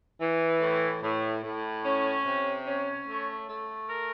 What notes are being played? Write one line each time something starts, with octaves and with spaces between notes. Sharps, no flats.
E3
A2
A2
A2
C#4
C3
C#4
A3
A3
A#4